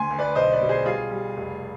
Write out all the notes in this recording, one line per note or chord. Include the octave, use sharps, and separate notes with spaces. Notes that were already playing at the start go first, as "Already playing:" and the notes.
Already playing: D2 G#5 C6
D2
B4 D5
B1 C5 D#5
B4 D5
B2
G#4 C5
G3 F4 G#4
G3
F1